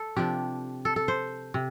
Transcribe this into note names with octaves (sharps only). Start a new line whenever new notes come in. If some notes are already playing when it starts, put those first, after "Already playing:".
Already playing: A4
C3 F3 D4 G4
A4
A4
C5
C3